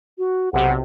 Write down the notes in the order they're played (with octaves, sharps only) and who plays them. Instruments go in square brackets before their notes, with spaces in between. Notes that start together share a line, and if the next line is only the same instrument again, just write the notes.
[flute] F#4
[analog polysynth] B1 C3 [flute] F#5